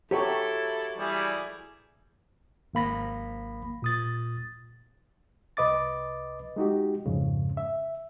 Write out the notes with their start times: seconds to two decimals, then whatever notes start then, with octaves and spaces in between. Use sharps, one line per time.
0.11 F#3 A3 E4 G4 A4 C#5 D5 G5
0.98 E3 G3 E4 G#4 D5
2.74 G#1 A#3 B5 A#6
3.82 A#2 D#6 A6
5.57 C2 B4 D#5 D6 A6
6.56 G#3 D#4 F#4 G4
7.06 F2 G#2 C#3
7.57 E5